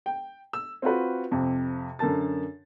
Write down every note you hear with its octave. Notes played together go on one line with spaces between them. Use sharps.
G5
E6
C4 F4 F#4 B4
F2 C3
F#2 D3 A#4 A5 A6